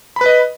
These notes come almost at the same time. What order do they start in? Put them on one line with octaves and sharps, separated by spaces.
B5 B4 D#5